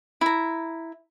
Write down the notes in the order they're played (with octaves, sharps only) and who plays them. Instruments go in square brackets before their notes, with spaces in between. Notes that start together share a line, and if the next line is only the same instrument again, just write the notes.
[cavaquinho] E4 A#5